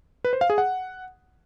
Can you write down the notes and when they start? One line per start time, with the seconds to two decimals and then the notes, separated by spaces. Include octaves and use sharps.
0.25 B4
0.33 C5
0.41 F5
0.50 G#4
0.58 F#5